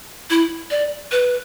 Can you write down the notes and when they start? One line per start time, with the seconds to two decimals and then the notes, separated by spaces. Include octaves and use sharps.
0.30 E4
0.71 D5
1.12 B4